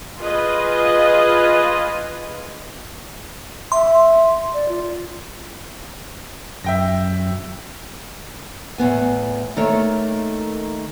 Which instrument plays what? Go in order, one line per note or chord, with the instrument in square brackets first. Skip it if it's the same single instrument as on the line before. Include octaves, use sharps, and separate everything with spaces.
[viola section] F4 G#4 B4 D#5
[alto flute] E5 [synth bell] C6
[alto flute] D5
F4
[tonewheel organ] F#2 [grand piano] E5 G5 A#6
[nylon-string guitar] E2 A2 B3 G#5
D#3 A3 A#3 A4 C#5